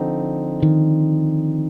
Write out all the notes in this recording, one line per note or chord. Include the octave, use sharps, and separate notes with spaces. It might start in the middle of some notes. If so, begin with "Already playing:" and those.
Already playing: D3 F3 C4 D#4
D#3